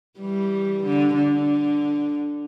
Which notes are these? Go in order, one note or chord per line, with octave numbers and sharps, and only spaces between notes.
E3 G3
D3
D3